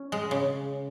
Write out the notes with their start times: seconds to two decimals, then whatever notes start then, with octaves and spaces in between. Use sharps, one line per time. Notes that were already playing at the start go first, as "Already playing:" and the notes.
Already playing: C#4
0.12 G#3
0.31 C#3